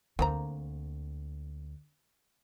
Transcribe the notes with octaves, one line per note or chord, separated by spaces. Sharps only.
D2 A#3 C4 A#5